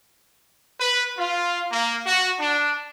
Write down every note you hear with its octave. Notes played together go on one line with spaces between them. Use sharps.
B4
F4
A#3
F#4
D4